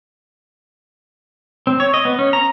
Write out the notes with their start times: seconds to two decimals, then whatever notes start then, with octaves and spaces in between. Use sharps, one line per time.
1.67 C4
1.80 C#5
1.94 D#5
2.05 B3
2.19 C#4
2.33 A#5